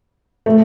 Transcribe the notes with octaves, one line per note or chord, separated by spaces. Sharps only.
A3